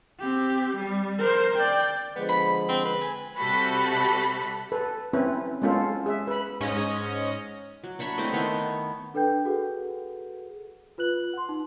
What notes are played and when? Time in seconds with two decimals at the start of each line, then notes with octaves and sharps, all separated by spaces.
0.20 C4 G4
0.77 G3
1.19 A#4 C5
1.57 D5 G5
2.16 D3 F3 G#3 B3
2.29 B5
2.69 C4
2.85 B4
3.01 G#5
3.37 C3 G3 F#4 A4 B5
4.72 A4 B4
5.13 C4 C#4 E4 B4
5.62 G#3 B3 C#4 F4 A4
6.06 G#4 E5
6.27 B4 B5
6.60 G#2 C#4 D#5
7.84 F#3
7.99 D4 C#5 E5 B5
8.18 A3 C4 E4 D#5
8.33 D#3 B3 C#5 C6
9.14 D4 A4 B4 G5 G6
9.45 F#4 G#4 A4 B4 F#5
10.98 F4 B4 F#6 F#7
11.33 F#5 C6
11.49 D#4